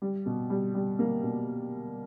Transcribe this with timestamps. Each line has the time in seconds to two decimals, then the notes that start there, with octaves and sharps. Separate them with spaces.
0.02 G3
0.26 B2
0.50 G3
0.75 G3
0.99 A#3
1.23 B2